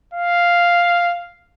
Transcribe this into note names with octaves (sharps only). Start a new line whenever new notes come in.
F5